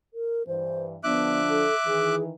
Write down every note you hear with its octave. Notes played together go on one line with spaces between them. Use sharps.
A#4
G2 E3 C5
D3 F3 B3 D4 E5 D6 F#6
A4
D#3 E3 G#4